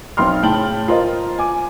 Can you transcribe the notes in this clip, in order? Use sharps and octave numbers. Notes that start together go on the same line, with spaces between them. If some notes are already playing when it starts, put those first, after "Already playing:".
B1 C4 G5 C6 F6
A2 C#3 G5 A5 F#7
F4 A#4 C5 D#5
G#5 D6